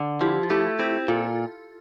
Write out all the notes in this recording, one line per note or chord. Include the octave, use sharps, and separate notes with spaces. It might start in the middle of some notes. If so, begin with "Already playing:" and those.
Already playing: D3
F3 E4 G4
F4
A3 E4 G4
C4 E4 G4
A#2 F4 A4